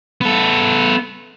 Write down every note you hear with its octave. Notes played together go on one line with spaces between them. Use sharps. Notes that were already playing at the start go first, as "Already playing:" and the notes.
B3 A4